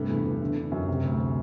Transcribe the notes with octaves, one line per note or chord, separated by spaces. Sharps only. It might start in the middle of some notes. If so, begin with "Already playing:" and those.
Already playing: G2 C3 A3
E2
E2
D3
D3
F#2
C3
D2
C3